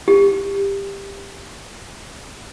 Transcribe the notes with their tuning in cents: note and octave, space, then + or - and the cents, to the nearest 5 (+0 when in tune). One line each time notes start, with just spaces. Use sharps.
G4 +15